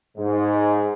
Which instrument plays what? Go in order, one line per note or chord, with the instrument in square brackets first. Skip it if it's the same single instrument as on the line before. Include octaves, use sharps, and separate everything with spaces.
[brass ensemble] G#2